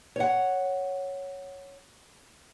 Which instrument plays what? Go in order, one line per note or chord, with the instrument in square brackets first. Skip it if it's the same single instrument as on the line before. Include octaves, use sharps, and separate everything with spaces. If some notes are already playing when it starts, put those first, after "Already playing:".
[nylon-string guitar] C#5 F#5